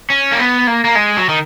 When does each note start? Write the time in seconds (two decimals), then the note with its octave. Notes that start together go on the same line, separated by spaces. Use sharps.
0.10 C#4
0.32 A#3
0.39 B3
0.67 A#3
0.85 A#3
0.95 G#3
1.17 F#3
1.29 D#3